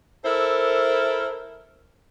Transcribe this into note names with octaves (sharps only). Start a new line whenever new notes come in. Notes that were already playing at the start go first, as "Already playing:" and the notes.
E4 A4 A#4 C5